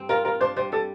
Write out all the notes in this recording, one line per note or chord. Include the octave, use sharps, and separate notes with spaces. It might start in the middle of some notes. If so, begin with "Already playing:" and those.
Already playing: G2 C4
F4 A#4
F4 A#4
D4 C5
G3 C5
G3 A4